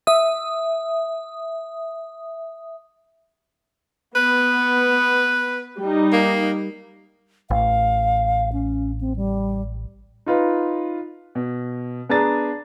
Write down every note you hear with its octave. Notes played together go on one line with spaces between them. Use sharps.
E5 D#6
B3 B4
G3 D#4
A#3
A1 F5
C#4
C4
G3
D#4 F4 B4
B2
B3 D4 G#4 A#5 A6